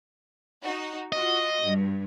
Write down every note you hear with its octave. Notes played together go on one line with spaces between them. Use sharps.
D#4 F#4
F4 F#4 D#5
G2